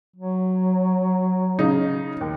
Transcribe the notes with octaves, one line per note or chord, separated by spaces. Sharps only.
F#3
C#3 D#4
D#2